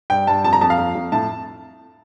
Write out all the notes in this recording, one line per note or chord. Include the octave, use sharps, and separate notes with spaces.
G2 G5
G2 A5
F2 A5
A#5
F2 A5
F5
F2
F2
A2 A5